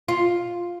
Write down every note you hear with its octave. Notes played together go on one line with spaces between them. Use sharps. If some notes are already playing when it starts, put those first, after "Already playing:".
F4